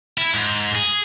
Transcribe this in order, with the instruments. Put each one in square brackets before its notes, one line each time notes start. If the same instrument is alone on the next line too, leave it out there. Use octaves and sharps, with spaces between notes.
[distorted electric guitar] E4
G#2
G#4